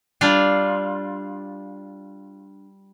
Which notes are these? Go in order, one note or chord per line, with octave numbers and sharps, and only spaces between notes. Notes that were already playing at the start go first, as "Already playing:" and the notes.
G3 D4 F4